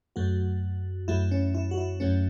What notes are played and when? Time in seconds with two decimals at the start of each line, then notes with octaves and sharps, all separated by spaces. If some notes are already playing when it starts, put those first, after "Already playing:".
0.16 F#2 F#3 A3 F#4
1.08 F#2 F#3 A3 E4
1.31 C#4
1.54 E4
1.71 F#4
1.77 E4
2.00 F#2 F#3 A3 C#4